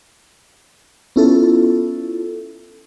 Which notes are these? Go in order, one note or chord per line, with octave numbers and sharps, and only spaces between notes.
B3 C#4 E4 F4 A4